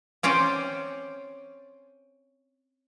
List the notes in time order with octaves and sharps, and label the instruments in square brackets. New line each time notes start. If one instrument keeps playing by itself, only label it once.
[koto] C4 C#4 C5 D5